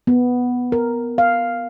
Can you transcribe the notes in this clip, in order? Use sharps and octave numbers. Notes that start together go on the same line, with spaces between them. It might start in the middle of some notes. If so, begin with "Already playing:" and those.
B3
A#4
F5